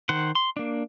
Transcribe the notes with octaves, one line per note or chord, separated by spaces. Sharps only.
D#3 C5 F#5
C6
A#3 D4